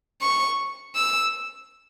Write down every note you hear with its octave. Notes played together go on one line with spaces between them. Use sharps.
C#6
E6